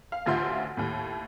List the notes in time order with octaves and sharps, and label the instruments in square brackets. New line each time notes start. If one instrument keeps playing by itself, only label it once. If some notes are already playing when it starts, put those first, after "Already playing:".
[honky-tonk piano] F5
A1 D2 F4 E5 C6 G6
D#2 A2